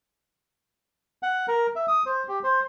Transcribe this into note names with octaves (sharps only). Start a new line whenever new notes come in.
F#5
A#4
E5
D#6
C5
G4
C5